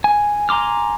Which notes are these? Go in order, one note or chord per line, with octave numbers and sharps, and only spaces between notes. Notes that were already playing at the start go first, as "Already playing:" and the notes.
G#5
G#5 A#5 C6 D6 F6